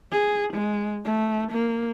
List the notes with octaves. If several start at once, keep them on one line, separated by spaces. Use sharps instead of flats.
G#4
G#3
A3
A#3